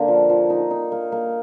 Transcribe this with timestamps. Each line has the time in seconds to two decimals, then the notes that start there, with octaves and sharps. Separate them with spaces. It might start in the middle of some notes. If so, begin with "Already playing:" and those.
Already playing: D3 A#3
0.08 F3
0.30 F3
0.50 D#4
0.71 D#4
0.92 A#3
1.12 A#3